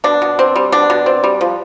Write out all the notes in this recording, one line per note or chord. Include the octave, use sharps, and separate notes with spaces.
B2 D4
B2
C4
G3
B2 D4
B2
C4
G3
F3